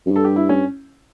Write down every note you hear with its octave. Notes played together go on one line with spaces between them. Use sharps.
F#2
G2 A4
G4
E4
C#4